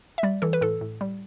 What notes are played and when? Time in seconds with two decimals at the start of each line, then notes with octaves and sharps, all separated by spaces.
0.18 E5
0.23 G3 D5
0.42 E3 A4
0.53 B4
0.61 A2 A4
0.81 A2
1.01 G3